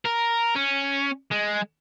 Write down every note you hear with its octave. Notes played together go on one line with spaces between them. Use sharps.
A#4
C#4
G#3